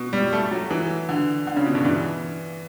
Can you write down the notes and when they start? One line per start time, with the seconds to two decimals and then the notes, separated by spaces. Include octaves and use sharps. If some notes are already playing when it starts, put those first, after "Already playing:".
Already playing: B2
0.13 G3
0.33 A3
0.51 F#3
0.70 E3
1.09 D3
1.47 D3
1.56 C#3
1.66 B2
1.75 G2
1.85 E3